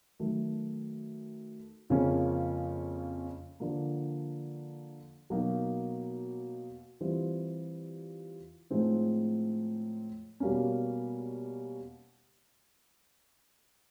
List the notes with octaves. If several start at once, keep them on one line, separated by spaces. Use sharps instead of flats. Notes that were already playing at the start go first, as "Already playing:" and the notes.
D#3 F#3 A3
F2 C#3 F3 A#3 C#4
D3 F3 A#3
B2 F#3 A#3 D#4
E3 G3 C4 F4
A2 F3 G#3 C4 D#4
B2 G3 A#3 C#4